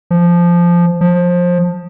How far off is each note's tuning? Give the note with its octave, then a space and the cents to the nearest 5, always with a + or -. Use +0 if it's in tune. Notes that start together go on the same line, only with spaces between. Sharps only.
F3 -10
F3 +20